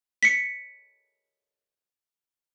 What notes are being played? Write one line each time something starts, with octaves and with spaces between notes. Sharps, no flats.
B6 C#7